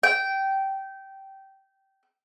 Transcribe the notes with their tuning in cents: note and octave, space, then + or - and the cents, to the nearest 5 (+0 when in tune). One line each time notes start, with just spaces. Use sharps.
G5 -15